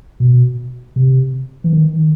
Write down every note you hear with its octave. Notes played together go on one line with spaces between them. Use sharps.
B2
C3
E3
D#3